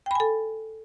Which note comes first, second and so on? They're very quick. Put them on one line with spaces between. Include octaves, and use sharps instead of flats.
G5 B5 G#5 A4